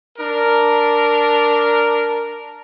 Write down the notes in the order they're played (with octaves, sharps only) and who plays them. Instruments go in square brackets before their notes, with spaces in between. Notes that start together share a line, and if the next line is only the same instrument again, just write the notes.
[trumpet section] D4 A#4